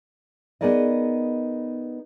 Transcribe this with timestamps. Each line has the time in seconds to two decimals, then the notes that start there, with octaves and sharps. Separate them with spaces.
0.61 B3 D#4 G#4 A#4 D5 D#5